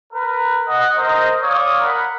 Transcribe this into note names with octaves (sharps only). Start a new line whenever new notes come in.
A#4 B4
D#5 F#5
A#4 C5 D#5
C#5 D5 F5 D#6
A#4 F#5 B5